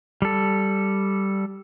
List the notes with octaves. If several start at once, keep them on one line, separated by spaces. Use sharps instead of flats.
G3 A4